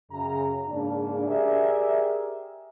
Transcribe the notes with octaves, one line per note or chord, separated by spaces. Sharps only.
F#2 C#3 A#5
G#2 C#3 A#3 D4
G4 G#4 A#4 D5 E5